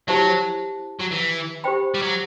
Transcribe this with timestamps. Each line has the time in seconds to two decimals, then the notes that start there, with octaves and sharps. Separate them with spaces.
0.08 F#3 E4 G4 C5 E5 A5
1.00 F#3
1.12 E3
1.64 G4 C5 G5 B5
1.94 G3
2.02 F#3